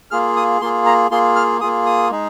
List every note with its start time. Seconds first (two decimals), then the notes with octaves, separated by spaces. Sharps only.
0.11 A#3 F4 G#4 F6
0.36 D#6
0.61 A#3 F4 G#4 C6
0.86 A#5
1.11 A#3 F4 G#4 C6
1.36 F6
1.61 A#3 F4 G#4 D#6
1.86 D#6
2.11 G#3 D#4 G#4